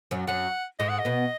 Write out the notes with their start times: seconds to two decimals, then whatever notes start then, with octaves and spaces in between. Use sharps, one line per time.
0.11 F#2 F#3
0.27 F#2 F#3 F#5
0.80 G#2 G#3 D#5
0.89 F#5
0.99 D#5
1.05 B2 B3